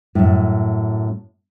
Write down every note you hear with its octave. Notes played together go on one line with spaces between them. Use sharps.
F#2 A2